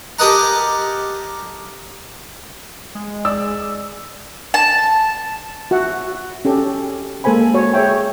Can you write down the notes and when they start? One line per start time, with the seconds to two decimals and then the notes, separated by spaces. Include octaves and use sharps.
0.19 G4 A4 A#4 D#5 F#5 A#5
2.95 G#3
3.25 D5 E6
4.54 A5
5.71 F#4 E5 F#5
6.45 C#4 G4 A4
7.24 G#3 A#3 A4 C5 G#5 B5
7.54 F#4 C#5 G#5
7.74 G#4 C#5 E5 G5